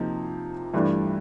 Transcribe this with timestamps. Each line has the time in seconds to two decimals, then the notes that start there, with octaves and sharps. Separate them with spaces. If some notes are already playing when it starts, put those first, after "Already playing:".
Already playing: C3 F3 A#3 D#4
0.74 G2 E3 A3 D4